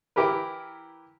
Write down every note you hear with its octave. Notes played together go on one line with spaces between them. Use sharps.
E3 E4 G4 A#4 B4